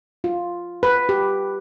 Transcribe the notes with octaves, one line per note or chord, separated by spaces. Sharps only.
F4
B4
G4